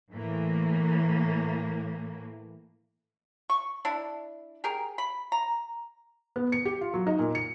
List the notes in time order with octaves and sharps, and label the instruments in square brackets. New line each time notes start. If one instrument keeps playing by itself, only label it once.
[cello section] A2 E3 A#3
[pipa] C#6
D4 E4
G4 G#4 A#4
B5
A#5
[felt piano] B3
C#7
G4
F4
F#3
D#4
A#2
C#7